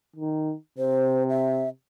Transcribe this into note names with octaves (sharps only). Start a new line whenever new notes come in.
D#3
C3 C5
E5